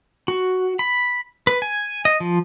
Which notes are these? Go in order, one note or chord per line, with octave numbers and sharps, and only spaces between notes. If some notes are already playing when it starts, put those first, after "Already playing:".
F#4
B5
B4
G#5
D#5
F3